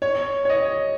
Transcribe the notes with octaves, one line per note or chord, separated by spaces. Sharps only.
C#5
C#5
D#5